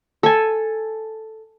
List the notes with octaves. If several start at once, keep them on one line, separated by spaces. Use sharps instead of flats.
A4 G#5